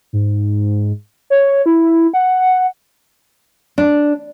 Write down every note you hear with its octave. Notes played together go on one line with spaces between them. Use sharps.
G#2
C#5
E4
F#5
D4